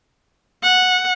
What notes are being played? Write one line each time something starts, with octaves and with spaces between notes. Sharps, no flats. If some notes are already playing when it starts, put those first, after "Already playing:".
F#5